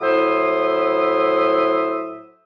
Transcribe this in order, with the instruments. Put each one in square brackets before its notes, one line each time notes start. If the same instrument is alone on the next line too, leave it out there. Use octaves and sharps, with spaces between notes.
[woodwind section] A2 F#3 E4 C5 E5 D#6